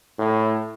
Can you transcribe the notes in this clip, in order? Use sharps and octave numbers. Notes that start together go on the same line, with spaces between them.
A2